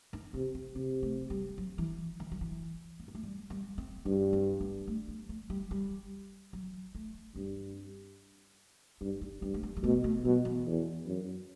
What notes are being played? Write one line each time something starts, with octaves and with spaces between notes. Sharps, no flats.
D#4
C3 C4
C4
C3 C4
A3
G3
F#3
E3
D#3
F#3
E3
C4
B3
A3
G3
G3
C4
G2 D#4
C4
B3
A3
B3
A3
G3
G3
F#3
A3
G2 C4
G2 C4
D#4
G2 C4
A3
B3
G3
B2 A3
A3
B2 F#3
E3
E2
F#2